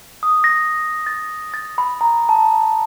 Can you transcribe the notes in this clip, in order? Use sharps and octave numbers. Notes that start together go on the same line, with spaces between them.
D#6
A#6
A6
A6
B5
A#5
A5